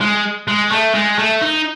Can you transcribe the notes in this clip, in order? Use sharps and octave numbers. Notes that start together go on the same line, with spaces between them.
G#3
G#3
A3
G#3
A3
D#4